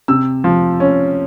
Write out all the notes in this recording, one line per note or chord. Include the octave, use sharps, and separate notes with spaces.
C3 E6
F3
C#4